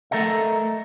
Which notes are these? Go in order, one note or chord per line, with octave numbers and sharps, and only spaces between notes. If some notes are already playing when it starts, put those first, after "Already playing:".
A3 A4 A#4 D#5 E5